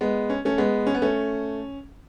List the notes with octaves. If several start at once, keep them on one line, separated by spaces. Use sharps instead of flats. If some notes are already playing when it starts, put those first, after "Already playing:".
G#3 B3
C#4
A3 C#4
G#3 B3
C#4
B3
A3 C#4